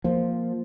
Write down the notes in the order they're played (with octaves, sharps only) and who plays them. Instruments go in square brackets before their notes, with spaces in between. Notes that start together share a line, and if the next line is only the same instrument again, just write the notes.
[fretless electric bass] F3 [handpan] A#3 F4 C5